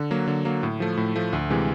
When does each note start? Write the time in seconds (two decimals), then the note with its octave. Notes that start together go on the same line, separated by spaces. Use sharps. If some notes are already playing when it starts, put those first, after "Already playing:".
Already playing: D3
0.11 F#3 A#3
0.27 D3
0.45 F#3 A#3
0.63 A2
0.80 F3 A3
0.97 A2
1.16 F3 A3
1.33 D2
1.50 C3 E3 G#3